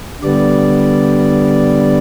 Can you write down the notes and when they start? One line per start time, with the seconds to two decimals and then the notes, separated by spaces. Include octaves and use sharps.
0.22 D3 G3 B3 D5